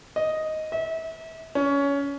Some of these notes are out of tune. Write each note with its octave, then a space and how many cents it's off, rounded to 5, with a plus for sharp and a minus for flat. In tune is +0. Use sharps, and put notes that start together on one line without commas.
D#5 +5
E5 -30
C#4 +20